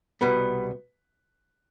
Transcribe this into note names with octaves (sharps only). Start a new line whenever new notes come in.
C2 B2 G3 B3 B4